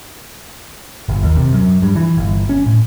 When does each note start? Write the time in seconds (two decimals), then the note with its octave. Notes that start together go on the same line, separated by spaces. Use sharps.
1.09 G1
1.23 D#2
1.37 C3
1.52 F#2
1.82 G2
1.95 E3
2.17 G1
2.49 C#4
2.66 A2